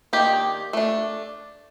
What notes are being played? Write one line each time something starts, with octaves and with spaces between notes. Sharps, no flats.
D#3 A#3 D4 D#4 G4
A3 D4